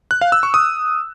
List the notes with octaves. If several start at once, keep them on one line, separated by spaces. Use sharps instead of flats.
F#6
F5
E6
C#6
D#6